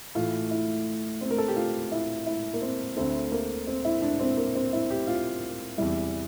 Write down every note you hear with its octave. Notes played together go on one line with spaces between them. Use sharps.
A2 E3 A3 F4
E4
C4
A#4
A4
G4
F4
E4
E4
A#3
C4
D2 D3 A3 C4
A#3
C4
E4
D4
C4
A#3
C4
E4
G4
F4
E2 C3 G3 E4